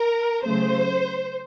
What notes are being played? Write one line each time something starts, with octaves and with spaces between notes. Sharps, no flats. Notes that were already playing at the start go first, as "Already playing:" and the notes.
Already playing: A#4
C#3 F#3 A3 C5